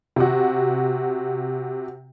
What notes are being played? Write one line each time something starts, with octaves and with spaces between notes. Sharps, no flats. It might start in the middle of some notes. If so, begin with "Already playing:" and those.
C3 F#4